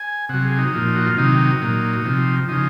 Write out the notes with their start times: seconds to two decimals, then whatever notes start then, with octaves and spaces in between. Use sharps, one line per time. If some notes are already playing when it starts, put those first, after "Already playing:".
Already playing: G#5
0.29 C3 F#3 F#5
0.45 G#4
0.58 D#4
0.73 A#2 F3
0.95 F#4
1.06 F4
1.17 C3 D#3 F#3 D#4
1.60 A#2 F#3
2.05 C3 F3
2.48 C#3 F3 D#4